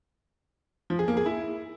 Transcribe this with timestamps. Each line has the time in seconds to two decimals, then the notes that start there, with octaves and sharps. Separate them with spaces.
0.90 F3
0.99 G#4
1.08 A#3
1.17 G#4
1.26 E4